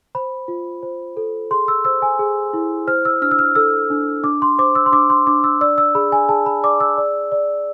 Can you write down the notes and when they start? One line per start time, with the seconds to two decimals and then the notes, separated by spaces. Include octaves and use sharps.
0.15 C5 B5
0.48 F4
0.83 C5
1.17 A4
1.51 G#4 C6
1.68 E6
1.85 C5 E6
2.02 G#5
2.19 G#4
2.53 E4
2.88 C5 F6
3.05 E6
3.22 D4 F6
3.31 E6
3.39 F6
3.55 A4 E6
3.90 D4
4.24 D4 D6
4.42 C6
4.59 C5 D6
4.75 E6
4.86 C6
4.92 D4 D6
5.10 C6
5.27 D4 D6
5.44 E6
5.61 D5 E6
5.78 E6
5.95 G#4 B5
6.12 G#5
6.29 G#4 A5
6.46 B5
6.63 D5 D6
6.80 E6
6.98 D5
7.32 D5